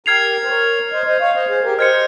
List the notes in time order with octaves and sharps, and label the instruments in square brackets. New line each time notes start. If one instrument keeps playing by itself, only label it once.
[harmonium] G4 A#4 [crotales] F6 G#6 C7 F7
[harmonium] C5
A#4 C#5
C5 D#5
C5 D#5
C#5 F5
C5 D#5
G#4 C5
G4 A#4
[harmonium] C5 D#5 [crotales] F6 G#6 C#7